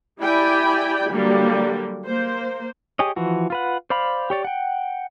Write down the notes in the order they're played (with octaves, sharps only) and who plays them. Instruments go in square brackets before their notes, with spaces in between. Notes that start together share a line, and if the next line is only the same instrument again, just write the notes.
[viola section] E4 G4 D5 G5 G#5 B5
D3 F#3 G3 A#3
A#3 C5
[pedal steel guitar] G4 G#4 C#5 D#5
E3 F3 F#4
F4 B4 F#5
C5 D5 F5 B5
G4 C#5 D5
F#5 G5